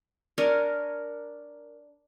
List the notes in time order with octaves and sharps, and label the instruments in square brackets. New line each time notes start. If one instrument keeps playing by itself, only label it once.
[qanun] D4 A#4 C#5 G#5